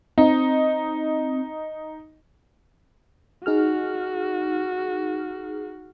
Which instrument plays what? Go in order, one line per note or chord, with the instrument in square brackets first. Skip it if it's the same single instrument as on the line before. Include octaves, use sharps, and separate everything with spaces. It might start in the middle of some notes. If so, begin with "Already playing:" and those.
[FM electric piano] C4 [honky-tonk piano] D#4
[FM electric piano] D#4 G#4 F6 [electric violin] F#4